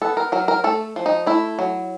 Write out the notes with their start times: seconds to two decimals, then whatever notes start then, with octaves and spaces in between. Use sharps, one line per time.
0.02 B3 A4
0.17 A#4
0.32 F#3 A#4
0.48 A#4
0.64 A3 A4
0.96 F3
1.06 D#4
1.26 A3 E4
1.59 F#3